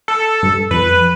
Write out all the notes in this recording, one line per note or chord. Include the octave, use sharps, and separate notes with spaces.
A4
G2
F2 B4